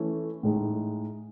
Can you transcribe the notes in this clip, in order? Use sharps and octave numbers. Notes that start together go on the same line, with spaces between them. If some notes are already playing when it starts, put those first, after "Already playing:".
Already playing: E3 A3 C#4 E4
A2 G#3 D#4